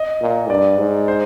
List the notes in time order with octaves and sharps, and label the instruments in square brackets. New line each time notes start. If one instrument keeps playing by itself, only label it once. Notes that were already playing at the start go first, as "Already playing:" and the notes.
Already playing: [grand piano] D#5
[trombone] A#2
[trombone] G2 [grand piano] D5
[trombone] G#2
[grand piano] C5